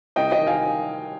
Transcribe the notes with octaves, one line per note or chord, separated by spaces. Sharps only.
C2 D#5 G5
D#5 G5
D#3
F5 G#5